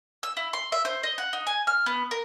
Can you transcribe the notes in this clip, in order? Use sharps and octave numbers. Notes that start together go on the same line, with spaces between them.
E6
E4
C6
E5
C5
D#5
F#5
D#4
G#5
F6
B3
A#4